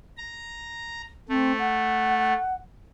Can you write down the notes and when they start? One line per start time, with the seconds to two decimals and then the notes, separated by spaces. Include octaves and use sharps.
0.17 A#5
1.29 A3 C4
1.59 F#5